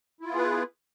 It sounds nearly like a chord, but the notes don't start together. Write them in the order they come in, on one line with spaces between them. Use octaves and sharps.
E4 F4 B3 G#4 B4